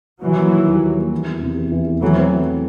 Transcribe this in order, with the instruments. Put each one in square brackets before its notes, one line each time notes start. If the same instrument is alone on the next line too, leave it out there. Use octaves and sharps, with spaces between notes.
[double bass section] E3 F#3 [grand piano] G3
[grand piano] A#3
D#3
D#2
G3
A#3
E3
E2
C3
E2
E3
E2
[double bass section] E3 F#3 [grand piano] A3
[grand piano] C4
E3